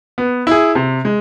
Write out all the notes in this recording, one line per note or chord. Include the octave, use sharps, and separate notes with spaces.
B3
E4 G#4
C3
G#3